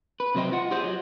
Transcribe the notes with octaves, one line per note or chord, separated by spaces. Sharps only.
B4
C3 F#3 C5 D#5 G5
F4 F#5
F4 G4 G#4 C5 D#5
F#3